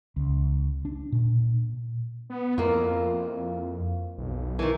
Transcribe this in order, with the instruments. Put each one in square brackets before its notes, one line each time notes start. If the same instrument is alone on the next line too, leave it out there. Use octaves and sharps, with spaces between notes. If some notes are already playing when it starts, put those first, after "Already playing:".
[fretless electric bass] C#2
D4
A#2
[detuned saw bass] B3
[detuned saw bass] F2 [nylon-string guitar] A#3 E4 F4
[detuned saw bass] B1
[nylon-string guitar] D#3 E3